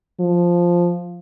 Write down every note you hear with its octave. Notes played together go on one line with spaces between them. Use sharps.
F3